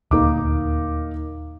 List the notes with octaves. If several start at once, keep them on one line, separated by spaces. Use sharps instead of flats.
D#1 D2 A#3 D#4 D6